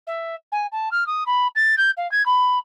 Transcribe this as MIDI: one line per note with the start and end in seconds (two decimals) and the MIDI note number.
0.07 0.35 76
0.52 0.67 80
0.72 0.89 81
0.91 1.07 89
1.07 1.24 87
1.26 1.48 83
1.55 1.75 93
1.77 1.91 91
1.97 2.10 77
2.12 2.25 92
2.26 2.59 83